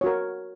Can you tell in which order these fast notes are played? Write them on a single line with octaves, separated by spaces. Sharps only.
C#5 F#4 A#4